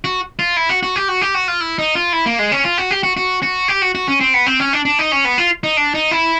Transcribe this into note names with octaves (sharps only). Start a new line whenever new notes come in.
F#4
F4
E4
F#4
F#4
G4
F#4
G4
F#4
F4
E4
D#4
F4
E4
A#3
G#3
C#4
F4
F#4
G4
F#4
F#4
F#4
G4
F#4
F#4
C#4
C4
B3
C4
C#4
D4
D4
D#4
C#4
B3
F4
D#4
D4
D#4
E4